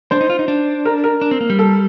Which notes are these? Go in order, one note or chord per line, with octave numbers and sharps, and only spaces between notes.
D4 C5
D#4
F4
D#4
D4
A#4
A#4
D4
C4
A#3
G3
A4